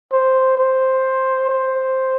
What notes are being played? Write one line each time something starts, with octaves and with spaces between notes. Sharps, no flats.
C5
C5
C5